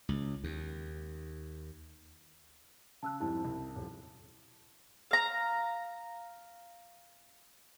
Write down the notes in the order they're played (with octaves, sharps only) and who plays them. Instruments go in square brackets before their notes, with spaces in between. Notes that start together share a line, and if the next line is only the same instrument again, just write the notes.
[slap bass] C#2
D#2
[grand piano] C#3 [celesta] A5 E6 F#6
[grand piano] F2 G#2 G3 [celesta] E4 A5
[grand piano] C2
D#1 F3
[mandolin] F5 A#5